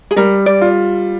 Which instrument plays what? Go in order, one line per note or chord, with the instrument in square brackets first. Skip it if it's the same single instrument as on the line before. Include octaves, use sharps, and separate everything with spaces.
[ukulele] G#4
[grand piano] G3 [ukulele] A#4
[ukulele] D5
[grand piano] F4